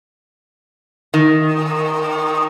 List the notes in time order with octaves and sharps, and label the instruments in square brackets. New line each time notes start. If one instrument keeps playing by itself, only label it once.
[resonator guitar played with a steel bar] D#3